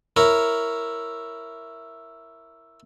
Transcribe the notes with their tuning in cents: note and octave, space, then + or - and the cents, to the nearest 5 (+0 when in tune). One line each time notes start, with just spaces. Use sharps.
E4 +0 A#4 +0 C#5 +0